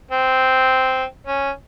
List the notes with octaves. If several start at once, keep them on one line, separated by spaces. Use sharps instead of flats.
C4
C#4